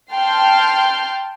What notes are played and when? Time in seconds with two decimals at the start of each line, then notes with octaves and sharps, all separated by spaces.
0.12 G5 A5 C6 F6 G6